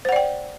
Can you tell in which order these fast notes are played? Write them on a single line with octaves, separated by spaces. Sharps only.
C5 F#5 D5 G5